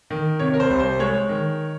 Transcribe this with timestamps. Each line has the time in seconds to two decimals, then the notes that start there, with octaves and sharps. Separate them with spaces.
0.10 D#3
0.39 C3 C#5
0.53 A#4
0.60 C5
0.70 C2
0.79 C5
0.99 G#3 C#5
1.29 D#3